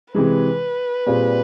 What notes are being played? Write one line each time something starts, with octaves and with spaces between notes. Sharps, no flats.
C3 E3 G#3 B4
A#2 G3 C4 F4 G#4